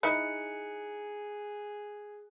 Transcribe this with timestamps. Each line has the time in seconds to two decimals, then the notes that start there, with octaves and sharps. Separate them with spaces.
0.03 D#4 E4 G#4 A#5 F#6 C#7